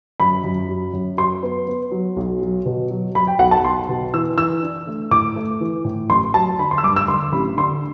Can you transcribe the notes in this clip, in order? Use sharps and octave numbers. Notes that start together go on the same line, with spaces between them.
F#2 B5
F#2
F#3
F#2
F#3 C6
B3
B3
F#3
B1
F#3
B2
F#3
F#3 B5
G5
B1 F#5
A5
B1 C6
B2
E3 E6
E3 E6
D4
A3
A2 D6
A3
E3
A2
A1 C6
F#3 A5
D3 B5
C6
E6
G2 D6
E6
D3 C6
A1 B5
D3 C6